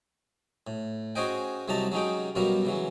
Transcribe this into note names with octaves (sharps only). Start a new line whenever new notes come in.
A2
C#4 F#4 G#4 C5 D#5 G5
C2 C3 F#3 D#4 A5 A#5
F#3 G#3 C#4 D#4 G5
F#2 B2 F#3 G3 A#4 F5
C#3 E3 F#3